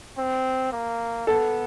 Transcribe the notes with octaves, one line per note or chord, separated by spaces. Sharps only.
C4
A#3
B3 A4